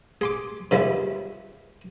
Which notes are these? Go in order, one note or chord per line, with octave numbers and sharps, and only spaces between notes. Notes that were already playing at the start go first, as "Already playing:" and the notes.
G#4 C6 D6
G2 D#3 F3 G3 G#3 E4